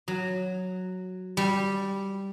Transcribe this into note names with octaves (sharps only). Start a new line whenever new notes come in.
F#3
G3